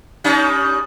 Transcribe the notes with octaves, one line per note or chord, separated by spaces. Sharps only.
G3 C#4 D#4